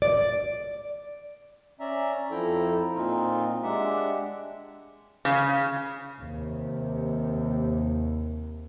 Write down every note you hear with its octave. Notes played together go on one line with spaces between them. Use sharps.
D5
C#4 D5 E5 A#5
F2 F3 E4 A4 G5 A#5
A#2 C4 D#4 F4
G#3 D4 G4 E5 F#5
C#3
D#2 C3